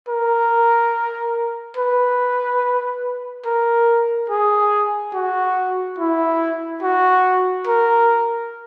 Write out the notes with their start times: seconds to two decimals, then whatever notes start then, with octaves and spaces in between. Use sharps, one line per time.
0.08 A#4
1.77 B4
3.46 A#4
4.30 G#4
5.14 F#4
5.99 E4
6.83 F#4
7.67 A#4